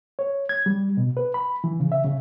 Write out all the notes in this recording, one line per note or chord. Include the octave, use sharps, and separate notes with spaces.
C#5
G#6
G3
B2
B4
B5
E3
C#3
E5
C#3